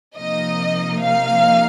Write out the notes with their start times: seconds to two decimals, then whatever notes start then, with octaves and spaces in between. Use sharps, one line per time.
0.16 C3 F3 A#3 D#4 D#5
1.01 F5